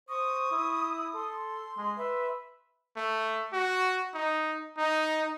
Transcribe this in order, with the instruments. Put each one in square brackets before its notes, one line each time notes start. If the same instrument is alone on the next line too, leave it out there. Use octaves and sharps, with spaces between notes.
[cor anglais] C5 [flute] C#6 [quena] D#6
[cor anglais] E4
[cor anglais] A4 [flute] C6
[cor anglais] G#3
[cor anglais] B4 [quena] E5
[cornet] A3
F#4
D#4
D#4